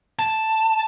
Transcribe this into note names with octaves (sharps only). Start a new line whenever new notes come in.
A5